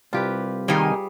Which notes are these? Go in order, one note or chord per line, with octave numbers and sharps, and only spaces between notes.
C2 F4 G4 B4
D#3 G3 A#3 D#4 G#4 G#5